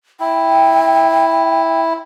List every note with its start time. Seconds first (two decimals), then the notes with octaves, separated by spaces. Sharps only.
0.20 E4 G5